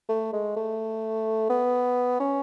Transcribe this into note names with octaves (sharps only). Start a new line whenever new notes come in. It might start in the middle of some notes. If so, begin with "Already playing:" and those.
A3
G#3
A3
B3
C#4